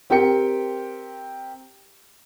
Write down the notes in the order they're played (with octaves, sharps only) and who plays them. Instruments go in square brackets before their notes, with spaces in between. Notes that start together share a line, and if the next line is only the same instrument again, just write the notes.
[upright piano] C4 G4 A#4 G5 C#7